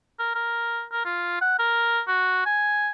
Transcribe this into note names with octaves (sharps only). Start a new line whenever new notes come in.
A#4
A#4
A#4
F4
F#5
A#4
F#4
G#5